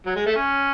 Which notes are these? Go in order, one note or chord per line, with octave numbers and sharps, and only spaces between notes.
F#3
G#3
A3
C#4